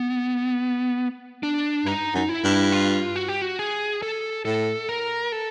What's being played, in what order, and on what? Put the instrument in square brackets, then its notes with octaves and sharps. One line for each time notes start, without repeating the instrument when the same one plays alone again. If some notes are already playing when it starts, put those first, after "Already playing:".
Already playing: [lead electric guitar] B3
D4
[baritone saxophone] G2 [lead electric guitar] D#4
[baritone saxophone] F#2 [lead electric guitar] D#4
[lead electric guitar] E4
[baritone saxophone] G2
[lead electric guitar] F4
F#4
G4
F#4
G#4
A4
[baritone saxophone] A2 [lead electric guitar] A4
[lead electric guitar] A#4
A4